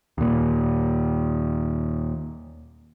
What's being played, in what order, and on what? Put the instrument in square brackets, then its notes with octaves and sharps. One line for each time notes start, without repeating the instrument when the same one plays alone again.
[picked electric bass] D#2 A#2